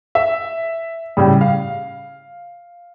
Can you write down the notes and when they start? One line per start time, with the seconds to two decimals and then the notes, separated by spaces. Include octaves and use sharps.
0.15 E5
1.17 A2 C#3 G3
1.41 F5